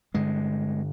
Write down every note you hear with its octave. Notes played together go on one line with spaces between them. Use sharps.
G2 D3 G#3